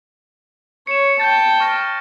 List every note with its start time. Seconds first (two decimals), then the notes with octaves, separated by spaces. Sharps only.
0.87 C#5 C#7 E7
1.20 G5 A5 G6 A6
1.60 C#6 F6 A#6